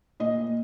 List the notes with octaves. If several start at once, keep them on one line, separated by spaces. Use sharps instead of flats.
A#2 D#5